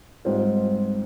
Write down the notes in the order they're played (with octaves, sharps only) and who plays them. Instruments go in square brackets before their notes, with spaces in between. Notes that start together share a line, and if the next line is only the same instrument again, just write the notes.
[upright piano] G#2 G3 C4 F4